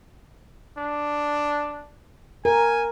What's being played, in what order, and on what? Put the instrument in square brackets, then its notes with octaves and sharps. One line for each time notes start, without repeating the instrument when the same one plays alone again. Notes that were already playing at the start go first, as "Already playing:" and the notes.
[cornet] D4
[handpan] A#4 [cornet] G#5